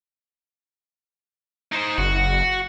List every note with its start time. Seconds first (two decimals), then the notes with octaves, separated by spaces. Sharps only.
1.72 D#4 C5
1.98 F#1 F#4